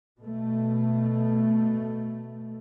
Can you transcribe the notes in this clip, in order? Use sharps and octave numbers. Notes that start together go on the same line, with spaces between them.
B2 A3